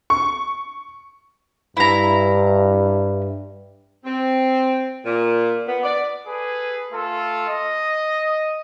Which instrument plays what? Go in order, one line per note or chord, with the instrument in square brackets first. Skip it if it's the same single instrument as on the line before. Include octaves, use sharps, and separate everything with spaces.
[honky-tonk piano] C#6
[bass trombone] G2 [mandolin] E4 A#5
[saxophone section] C4
A#2
B3
D5
[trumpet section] G#4 A4 B4
A3 F4 A4
D#5